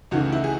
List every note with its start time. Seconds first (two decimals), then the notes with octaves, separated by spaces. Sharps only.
0.11 C#2 C#3 E3 A3 F#4
0.32 E4
0.44 G#4